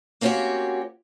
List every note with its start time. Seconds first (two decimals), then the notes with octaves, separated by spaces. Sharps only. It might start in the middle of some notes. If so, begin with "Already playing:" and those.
0.21 A#3 C4 C#4 D#4 F#4 G4